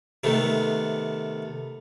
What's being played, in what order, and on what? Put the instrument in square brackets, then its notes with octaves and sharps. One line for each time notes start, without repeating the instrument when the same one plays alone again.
[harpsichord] C3 D#3 A3 B3